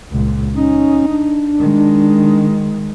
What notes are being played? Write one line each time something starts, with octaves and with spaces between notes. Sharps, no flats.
C#2 A#2
C#4 D#4
D4
D#3 G#3